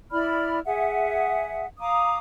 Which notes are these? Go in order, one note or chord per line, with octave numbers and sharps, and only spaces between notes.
E4 D5 B5 F6
G#4 E5 F#5
F5 A#5 D6 D#6